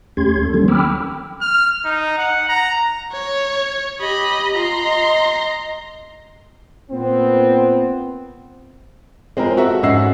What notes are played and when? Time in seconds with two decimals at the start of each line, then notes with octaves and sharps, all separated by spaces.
0.17 D#2 A3 C#4 G4 C6 G#6
0.42 A4
0.54 D#3 F#3 G3 A#3 C4 C#4
0.68 G5 B5 D6 E6 F6
1.41 F6
1.85 D#4
2.18 F#5
2.49 A#5
3.12 C#5
4.00 G4 D#5 B5
4.54 F4 A#5 C6
4.85 D#5
6.91 A#2 B3 C4
9.37 G#3 C4 F4 A#4
9.57 F#4 A4 E5
9.83 G#2 C#4 D#5 F#5 E6 C7